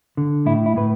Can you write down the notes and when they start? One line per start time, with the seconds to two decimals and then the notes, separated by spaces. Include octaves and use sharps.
0.17 D3
0.46 A2 E4
0.66 E4
0.76 A2 B4